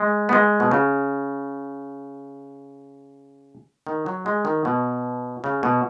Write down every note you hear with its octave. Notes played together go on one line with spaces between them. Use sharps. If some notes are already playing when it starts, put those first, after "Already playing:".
Already playing: G#3
B3
G#3
B2
C#3
D#3
F#3
G#3
D#3
B2
C#3
B2